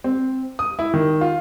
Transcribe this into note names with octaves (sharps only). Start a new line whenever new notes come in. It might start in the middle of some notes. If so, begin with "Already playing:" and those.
C4
D#6
E4
D#3
F4